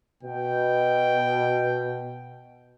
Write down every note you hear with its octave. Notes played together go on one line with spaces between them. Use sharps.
B2 G5